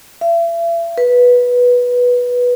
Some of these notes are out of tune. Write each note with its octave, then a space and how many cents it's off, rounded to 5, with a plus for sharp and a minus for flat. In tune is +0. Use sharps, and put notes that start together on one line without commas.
E5 +40
B4 -10